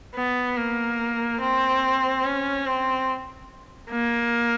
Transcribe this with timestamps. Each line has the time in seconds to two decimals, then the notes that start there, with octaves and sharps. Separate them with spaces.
0.15 B3
0.57 A#3
1.41 C4
2.24 C#4
2.66 C4
3.90 A#3